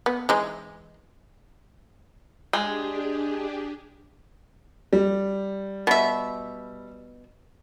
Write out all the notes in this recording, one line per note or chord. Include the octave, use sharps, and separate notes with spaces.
B3
E3 G#3 D#4
G#3 D4 G4 G#4
G3
B2 E5